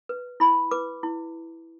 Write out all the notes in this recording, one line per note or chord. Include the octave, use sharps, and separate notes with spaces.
B4
E4 B5
B4 D6
E4